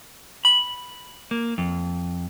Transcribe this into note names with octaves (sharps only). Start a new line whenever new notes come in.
B5
A#3
F2